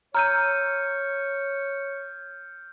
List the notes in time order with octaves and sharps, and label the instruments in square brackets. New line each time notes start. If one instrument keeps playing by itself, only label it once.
[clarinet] C#5 [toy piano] A#5 E6 [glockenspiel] F6 G6 D#7